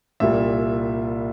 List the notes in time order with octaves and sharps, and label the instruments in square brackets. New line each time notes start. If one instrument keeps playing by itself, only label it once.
[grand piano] C2 A#2 G3 E5